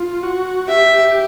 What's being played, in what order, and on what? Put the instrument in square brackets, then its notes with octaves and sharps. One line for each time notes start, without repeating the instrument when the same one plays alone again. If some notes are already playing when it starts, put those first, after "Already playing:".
Already playing: [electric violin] F4
F#4
[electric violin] G4 [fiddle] E5